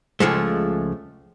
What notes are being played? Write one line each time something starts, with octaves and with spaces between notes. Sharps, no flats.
C#2 F3 G#3 A3